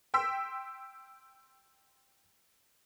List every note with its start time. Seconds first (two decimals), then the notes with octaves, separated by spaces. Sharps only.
0.14 G5 C6 E6 B6